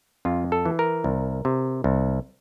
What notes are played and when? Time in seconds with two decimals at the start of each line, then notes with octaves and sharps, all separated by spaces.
0.25 F2 F4
0.52 A4
0.65 E3
0.79 A#4
1.04 C2
1.45 C3
1.84 C2